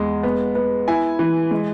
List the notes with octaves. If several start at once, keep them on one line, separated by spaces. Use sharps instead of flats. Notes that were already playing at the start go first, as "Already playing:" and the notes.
Already playing: E2 G#3
B3
B3
E4 G#5
E3
G#3